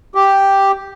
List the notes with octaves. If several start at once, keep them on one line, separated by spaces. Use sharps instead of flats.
G4